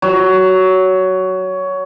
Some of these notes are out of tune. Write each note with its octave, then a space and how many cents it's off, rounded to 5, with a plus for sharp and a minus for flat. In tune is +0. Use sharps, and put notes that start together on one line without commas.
F#3 +15